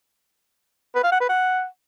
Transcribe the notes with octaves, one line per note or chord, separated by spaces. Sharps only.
B4
F5
F#5
B4
F#5